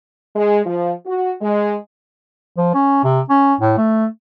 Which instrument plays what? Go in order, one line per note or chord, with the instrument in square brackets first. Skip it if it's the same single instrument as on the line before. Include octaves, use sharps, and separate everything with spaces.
[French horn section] G#3
F3
F#4
G#3
[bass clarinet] F3
C#4
C3
C#4
A2
A3